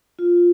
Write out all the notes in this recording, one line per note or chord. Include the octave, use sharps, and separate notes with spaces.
F4